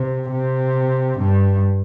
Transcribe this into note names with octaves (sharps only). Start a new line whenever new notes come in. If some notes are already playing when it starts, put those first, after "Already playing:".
Already playing: C3
C3
G2